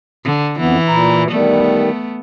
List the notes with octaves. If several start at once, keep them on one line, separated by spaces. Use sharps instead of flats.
D3
F2 E3 B3
A#2 E4 A#5
D#3 G3 A3 B3